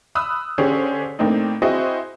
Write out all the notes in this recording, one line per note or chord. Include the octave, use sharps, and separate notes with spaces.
B5 D#6 E6 F#6
D3 C#4 G4 G#4 C5 C#5
A2 A#3 C4 D4 D#4
C4 E4 F#4 G#4 C5 D#5